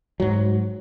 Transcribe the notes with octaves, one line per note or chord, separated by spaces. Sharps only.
G#2 F#3